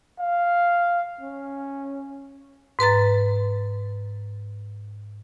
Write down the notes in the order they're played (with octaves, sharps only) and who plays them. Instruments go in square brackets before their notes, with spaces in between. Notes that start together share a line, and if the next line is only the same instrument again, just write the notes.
[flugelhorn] F5
C#4
[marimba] G#2 B4 A#5 A6